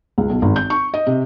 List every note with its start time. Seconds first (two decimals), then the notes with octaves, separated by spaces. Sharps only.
0.18 C#2
0.30 B1
0.42 G#1
0.56 G6
0.70 C#6
0.94 D#5
1.07 C3